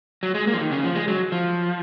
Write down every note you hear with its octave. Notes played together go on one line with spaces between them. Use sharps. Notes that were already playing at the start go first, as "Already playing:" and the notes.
F#3
G#3
A#3
F3
D#3
C#3
F3
G#3
F#3
F3